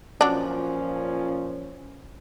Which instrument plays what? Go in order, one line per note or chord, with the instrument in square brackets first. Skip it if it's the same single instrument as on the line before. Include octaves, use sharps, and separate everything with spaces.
[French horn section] A#2 F3 C#4 [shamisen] F#3 D4